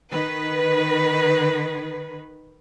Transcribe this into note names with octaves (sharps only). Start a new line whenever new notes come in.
D#3 B4